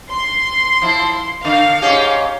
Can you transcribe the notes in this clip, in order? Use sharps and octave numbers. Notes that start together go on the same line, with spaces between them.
C6
F3 E4
D3 F5
G#2 C#4 G4